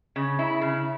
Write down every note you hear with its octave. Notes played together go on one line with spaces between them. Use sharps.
C#3
E4
C#3